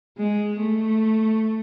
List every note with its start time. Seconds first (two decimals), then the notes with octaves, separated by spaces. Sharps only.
0.18 G#3
0.60 A3